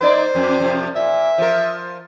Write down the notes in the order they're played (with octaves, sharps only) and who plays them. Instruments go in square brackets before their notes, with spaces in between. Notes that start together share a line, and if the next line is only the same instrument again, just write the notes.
[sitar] A#3 D#4 D5 [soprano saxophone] C5
[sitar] F2
F2 C3 F3
[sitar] A#2 [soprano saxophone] E5
[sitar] F3 A#4